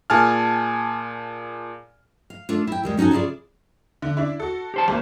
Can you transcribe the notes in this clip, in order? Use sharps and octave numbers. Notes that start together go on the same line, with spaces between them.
A#2 G#4 G#5 A5 F6
F5
A3 D4 F4
E4 G5
D#2 G3 G#3
C#4 D#4 F#4 A4 G#5
C#3 E4 F4 G#4 D5
D3
D4 E4
F#4 A4
G4 C5 A5
G#1 A#3 C5